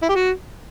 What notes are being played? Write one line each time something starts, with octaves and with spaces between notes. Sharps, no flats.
E4
G4
F#4